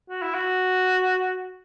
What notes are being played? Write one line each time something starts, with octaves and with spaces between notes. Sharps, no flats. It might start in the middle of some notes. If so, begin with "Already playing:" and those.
F#4
E4
F#4